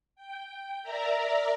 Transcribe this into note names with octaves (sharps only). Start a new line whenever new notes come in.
G5
A#4 D5 E5 A#5